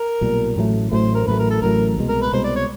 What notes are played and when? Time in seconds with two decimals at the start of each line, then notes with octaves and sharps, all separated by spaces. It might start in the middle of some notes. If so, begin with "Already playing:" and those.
Already playing: A#4
0.21 B1 A#2 G3
0.56 A1 A2 F#3 A3
0.91 A1 A2 F#3 A3 C5
1.15 A#4
1.27 A1 A2 F#3 A3 B4
1.39 A#4
1.50 A4
1.62 A1 A2 F#3 A3 A#4
1.97 C2 B2 G#3
2.09 A#4
2.21 B4
2.33 C2 B2 G#3 C5
2.44 D5
2.56 C#5